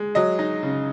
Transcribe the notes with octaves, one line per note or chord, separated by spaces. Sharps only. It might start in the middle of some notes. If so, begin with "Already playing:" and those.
Already playing: G#3
F#3 D#5
D#4
C#3